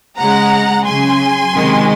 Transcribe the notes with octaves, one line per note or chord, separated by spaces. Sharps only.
C#3 G#3 F#5 A#5
C#3 F#3 G#5 C6
C3 D#3 G#3